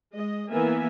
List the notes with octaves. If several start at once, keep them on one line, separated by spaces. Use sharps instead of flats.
G#3 D#5
E3 A#3 B3 A#4 E5 G#5